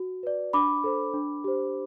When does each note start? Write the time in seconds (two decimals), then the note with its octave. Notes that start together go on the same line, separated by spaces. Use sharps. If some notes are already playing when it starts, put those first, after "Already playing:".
Already playing: F#4
0.23 B4 D5
0.53 D4 B5 D6
0.84 A4 C5
1.14 D4
1.44 G4 C5